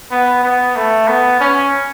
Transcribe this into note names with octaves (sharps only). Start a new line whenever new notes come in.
B3
B3
A3
B3
C#4